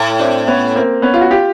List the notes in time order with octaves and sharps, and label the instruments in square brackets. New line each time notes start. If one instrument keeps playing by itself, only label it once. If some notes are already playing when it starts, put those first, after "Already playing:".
Already playing: [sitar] A2
[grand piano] C4 D4
B3 C#4
A#3 C4
B3 C#4
F4
F#4
F4 G4